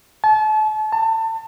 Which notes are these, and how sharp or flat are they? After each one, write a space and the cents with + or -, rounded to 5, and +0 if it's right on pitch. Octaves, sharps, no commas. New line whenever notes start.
A5 -35
A5 +30